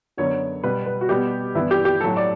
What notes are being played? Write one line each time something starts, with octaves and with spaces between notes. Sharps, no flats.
F#2 D3 F#3 B3 C#5
B2 G3 B3 B4
B4
F#4
B2 G3 B3 G4
G2 E3 B3 E4
G4
G4
A2 F#3 A3 A4
D5